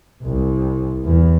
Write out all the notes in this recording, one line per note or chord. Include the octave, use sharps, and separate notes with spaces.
C2
E2